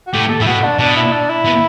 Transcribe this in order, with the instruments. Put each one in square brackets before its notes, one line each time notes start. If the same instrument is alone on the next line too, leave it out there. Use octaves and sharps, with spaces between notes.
[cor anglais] F#4
[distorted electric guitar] A2 [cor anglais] G4
[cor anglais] A4
[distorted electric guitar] A2 [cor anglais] E4
[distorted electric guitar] B2 [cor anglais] F#4
[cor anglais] D4
[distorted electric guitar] B2 [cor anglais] D4
[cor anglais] E4
D4
E4
[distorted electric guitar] B2